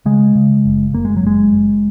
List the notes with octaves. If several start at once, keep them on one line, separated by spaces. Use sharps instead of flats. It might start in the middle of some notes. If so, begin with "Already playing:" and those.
C#3 G#3
C#3
F#1
F#1 A#3
G#3
F#3
F#1 G#3
F#1